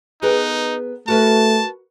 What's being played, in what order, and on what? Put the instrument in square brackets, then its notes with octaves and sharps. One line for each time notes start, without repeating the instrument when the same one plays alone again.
[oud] B3 G#4 A#4 [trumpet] D#4
[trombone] A3 [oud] F#4 A#4 B4 [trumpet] A5